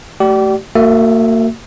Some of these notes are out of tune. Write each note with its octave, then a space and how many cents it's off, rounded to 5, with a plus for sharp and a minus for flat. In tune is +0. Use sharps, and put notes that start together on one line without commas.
A3 +0 G4 -35 D5 +0
A#3 -40 F#4 +0 E5 +0